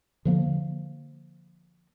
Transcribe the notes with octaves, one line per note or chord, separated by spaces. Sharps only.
D3 F3 A#3